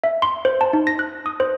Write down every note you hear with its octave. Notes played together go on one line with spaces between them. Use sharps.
E5
C6
C5
A5
D#4
A#6
F#6
D#6
C5